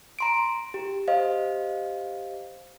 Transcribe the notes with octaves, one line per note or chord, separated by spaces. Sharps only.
A#5 C6 D7
G4
G4 C5 D#5 F5